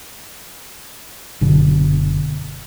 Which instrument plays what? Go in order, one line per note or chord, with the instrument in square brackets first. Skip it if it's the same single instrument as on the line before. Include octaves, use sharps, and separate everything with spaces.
[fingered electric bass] F#1 B2 D3